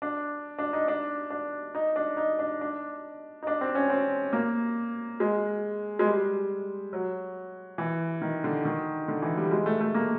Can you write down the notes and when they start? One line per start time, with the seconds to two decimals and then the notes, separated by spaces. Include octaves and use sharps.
0.02 D4
0.59 D4
0.73 D#4
0.88 D4
1.30 D4
1.75 D#4
1.96 D4
2.17 D#4
2.39 D4
2.61 D4
3.43 D#4
3.47 D4
3.61 C4
3.75 C#4
3.90 C4
4.33 A#3
5.20 G#3
5.99 G#3
6.05 G3
6.93 F#3
7.78 E3
8.21 D#3
8.44 D3
8.65 D#3
9.08 D3
9.22 E3
9.37 G3
9.51 G#3
9.66 A3
9.81 A3
9.94 A#3